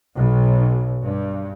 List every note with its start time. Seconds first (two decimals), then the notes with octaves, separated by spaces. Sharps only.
0.16 B1
1.04 G2